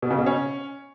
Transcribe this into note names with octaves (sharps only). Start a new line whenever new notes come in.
B2
C#3
B2
C#4